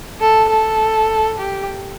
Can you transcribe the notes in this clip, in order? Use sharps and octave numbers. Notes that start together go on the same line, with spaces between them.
A4
A4
G4